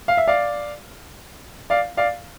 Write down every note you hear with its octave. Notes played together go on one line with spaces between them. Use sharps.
F5
E5
D5 F5
D5 F5
D5 F5